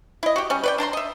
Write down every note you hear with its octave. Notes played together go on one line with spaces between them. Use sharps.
E4 D#5
F#4 G4
G3 C#4
B4 D5 G5
D4 A5 A#5 C6
D#5 E5